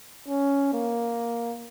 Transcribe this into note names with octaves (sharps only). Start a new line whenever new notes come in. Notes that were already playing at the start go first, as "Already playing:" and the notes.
C#4
A#3